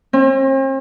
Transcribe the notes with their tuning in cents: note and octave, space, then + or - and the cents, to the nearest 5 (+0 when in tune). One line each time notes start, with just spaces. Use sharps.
C4 +45